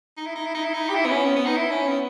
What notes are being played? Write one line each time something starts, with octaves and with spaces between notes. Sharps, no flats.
D#4
E4
D#4
E4
D#4
E4
D#4
G4
E4
B3
C#4
B3
B3
D#4
E4
C#4
B3